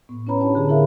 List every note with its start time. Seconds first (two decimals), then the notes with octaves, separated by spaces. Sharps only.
0.09 A2 B3
0.27 C#4 E4 B4 C#5 A#5 B5
0.40 D4 F4 G4 C#5 G5 A5
0.55 D3 G#4
0.69 E4 G#4 A#4 E5 F5 B5